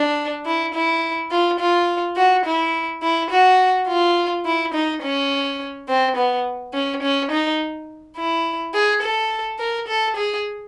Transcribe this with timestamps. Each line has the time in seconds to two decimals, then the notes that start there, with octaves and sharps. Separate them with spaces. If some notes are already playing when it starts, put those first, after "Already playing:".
Already playing: D4
0.45 E4
0.74 E4
1.31 F4
1.60 F4
2.16 F#4
2.45 E4
3.02 E4
3.31 F#4
3.88 F4
4.45 E4
4.74 D#4
5.02 C#4
5.88 C4
6.16 B3
6.74 C#4
7.02 C#4
7.31 D#4
8.17 E4
8.73 G#4
9.02 A4
9.59 A#4
9.88 A4
10.16 G#4